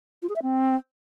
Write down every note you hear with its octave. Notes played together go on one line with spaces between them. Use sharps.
F4
G#4
E5
C4